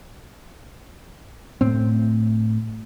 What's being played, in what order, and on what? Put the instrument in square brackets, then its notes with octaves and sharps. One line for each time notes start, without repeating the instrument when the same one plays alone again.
[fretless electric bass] A2 C4